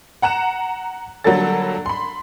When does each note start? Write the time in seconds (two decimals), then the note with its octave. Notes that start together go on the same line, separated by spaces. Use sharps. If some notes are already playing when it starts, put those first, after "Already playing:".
0.22 F#5 A#5 F#6 E7
1.24 D3 F#3 G3 A#3 A4 A6
1.86 B5 C6